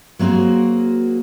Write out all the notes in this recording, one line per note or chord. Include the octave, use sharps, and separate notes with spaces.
F#3 A#3 C4 F#4 G#4